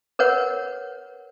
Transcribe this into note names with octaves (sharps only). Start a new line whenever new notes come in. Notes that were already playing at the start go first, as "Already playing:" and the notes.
A#4 B4 C#5 F#5